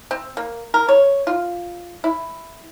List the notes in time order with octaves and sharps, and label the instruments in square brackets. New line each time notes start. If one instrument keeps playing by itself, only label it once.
[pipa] C4
A#3
A#4
C#5
F4
E4